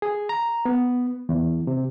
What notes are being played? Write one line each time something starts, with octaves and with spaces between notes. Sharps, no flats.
G#4
A#5
B3
E2
C3